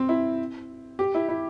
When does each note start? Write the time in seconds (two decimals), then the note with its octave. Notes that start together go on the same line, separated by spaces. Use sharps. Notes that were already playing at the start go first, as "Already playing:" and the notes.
Already playing: C4
0.09 E4
0.99 G4
1.15 E4
1.29 E4